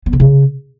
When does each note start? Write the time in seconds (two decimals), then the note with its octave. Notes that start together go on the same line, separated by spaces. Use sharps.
0.06 B3
0.13 D3
0.20 C#3